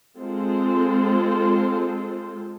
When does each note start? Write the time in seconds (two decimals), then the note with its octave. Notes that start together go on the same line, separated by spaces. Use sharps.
0.17 G#3 C4 F4 A4 C5